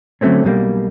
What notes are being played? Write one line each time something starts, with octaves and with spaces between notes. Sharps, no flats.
D3 F#3 G#3 A3 C4 C#4
B1 B2 G3 A#3